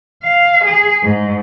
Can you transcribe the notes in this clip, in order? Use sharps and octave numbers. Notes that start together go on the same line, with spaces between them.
F5
G#4
G#2